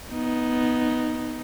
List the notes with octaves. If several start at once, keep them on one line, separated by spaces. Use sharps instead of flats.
B3 D#4